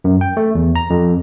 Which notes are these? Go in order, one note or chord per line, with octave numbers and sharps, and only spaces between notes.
F#2
G5
A3
E2
A#5
F2